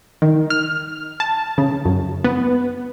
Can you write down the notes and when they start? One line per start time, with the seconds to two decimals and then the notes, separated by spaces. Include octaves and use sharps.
0.22 D#3
0.50 F6
1.20 A5
1.58 C#3
1.85 F#2
2.24 B3